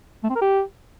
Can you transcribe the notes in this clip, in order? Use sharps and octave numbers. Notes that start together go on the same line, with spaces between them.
A3
C4
A#4
G4